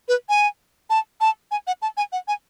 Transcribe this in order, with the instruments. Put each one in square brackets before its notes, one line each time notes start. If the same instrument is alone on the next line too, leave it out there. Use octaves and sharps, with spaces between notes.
[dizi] B4
G#5
A5
A5
G#5
F#5
A5
G#5
F#5
G#5